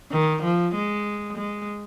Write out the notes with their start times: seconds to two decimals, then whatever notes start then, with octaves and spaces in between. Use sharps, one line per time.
0.11 D#3
0.43 F3
0.74 G#3
1.37 G#3